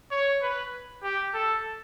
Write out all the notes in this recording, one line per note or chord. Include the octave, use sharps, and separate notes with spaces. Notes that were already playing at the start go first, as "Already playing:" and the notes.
C#5
B4
G4
A4